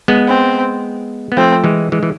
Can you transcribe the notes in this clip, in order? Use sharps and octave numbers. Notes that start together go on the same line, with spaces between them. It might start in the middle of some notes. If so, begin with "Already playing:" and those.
G#3 B3
C4
B3
F3 A3 C4
E3 G#3
E3 G#3
E3